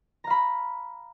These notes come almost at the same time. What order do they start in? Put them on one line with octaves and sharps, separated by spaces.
A#5 F5 B5